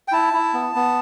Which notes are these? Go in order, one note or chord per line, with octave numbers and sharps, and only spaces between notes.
G5
E4 A5
E4
B3
B3